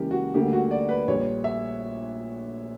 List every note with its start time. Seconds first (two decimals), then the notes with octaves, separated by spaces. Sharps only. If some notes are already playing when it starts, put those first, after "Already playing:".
Already playing: C#2 C#3 E3 A#3 G4 A#4
0.11 F#4
0.34 D2 D3 G3 A#3 G4
0.53 F#4
0.71 D5
0.89 B4
1.08 A#1 A#2 G3 C#5
1.44 E5